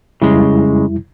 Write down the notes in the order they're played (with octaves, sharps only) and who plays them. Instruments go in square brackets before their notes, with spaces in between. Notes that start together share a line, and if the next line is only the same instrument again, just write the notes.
[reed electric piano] F2 G3 E4 [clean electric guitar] C#3 G#3